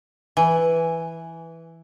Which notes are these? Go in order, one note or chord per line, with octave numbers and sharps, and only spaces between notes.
E3 G#5